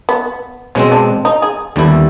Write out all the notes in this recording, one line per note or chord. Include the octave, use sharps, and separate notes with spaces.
B3
B2 G#3 C4 C#4
D4
D#4
G#4
D#2 D3 G3 B3 E4